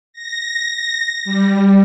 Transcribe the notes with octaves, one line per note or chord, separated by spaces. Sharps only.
A#6
G3